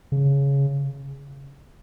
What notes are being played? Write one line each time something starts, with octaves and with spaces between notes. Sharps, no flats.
C#3